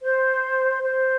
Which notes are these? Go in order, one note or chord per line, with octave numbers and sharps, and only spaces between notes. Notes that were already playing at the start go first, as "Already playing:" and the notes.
C5
C5